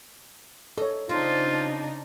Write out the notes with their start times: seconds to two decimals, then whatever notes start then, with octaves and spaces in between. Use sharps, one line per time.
0.78 D#4 A4 C#5
1.09 C#3 C4 D4 D#4 F4